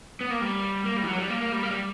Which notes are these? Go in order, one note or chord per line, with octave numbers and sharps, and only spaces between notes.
B3
A#3
G3
A#3
G3
E3
F#3
G3
A#3
A#3
G3
A#3
G3